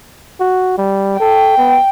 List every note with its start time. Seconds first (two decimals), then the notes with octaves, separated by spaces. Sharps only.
0.40 F#4
0.78 G3
1.20 A4 G5
1.57 B3